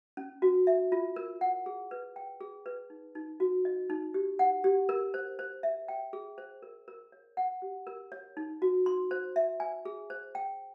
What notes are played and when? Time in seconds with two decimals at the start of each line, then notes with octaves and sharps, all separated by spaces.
0.17 C#4
0.42 F#4
0.67 E5
0.92 F4
1.16 A#4
1.41 F#5
1.66 G#4
1.91 B4
2.16 G5
2.41 G#4
2.66 B4
2.90 D#4
3.15 D#4
3.40 F#4
3.65 D#5
3.90 D#4
4.14 G4
4.39 F#5
4.64 G4
4.89 A#4
5.14 C5
5.39 C5
5.63 E5
5.88 G5
6.13 G#4
6.38 C5
6.62 A#4
6.88 A#4
7.12 C#5
7.37 F#5
7.62 G4
7.87 A#4
8.12 C#5
8.37 D#4
8.62 F#4
8.86 C6
9.11 C5
9.36 E5
9.60 G#5
9.85 G#4
10.10 C5
10.35 G5